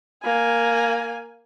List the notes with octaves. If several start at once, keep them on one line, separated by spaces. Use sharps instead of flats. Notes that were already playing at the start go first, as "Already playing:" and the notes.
A#3 G#5